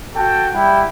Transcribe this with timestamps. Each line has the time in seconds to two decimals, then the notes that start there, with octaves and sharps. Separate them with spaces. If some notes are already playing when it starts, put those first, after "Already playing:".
0.15 F#4 A4 G5 A5
0.55 G3 E4 F#5 G5